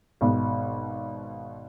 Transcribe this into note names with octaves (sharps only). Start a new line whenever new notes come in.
G#1 B2